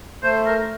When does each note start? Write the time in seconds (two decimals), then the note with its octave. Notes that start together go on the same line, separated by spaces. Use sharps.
0.23 A3 C5
0.46 A#4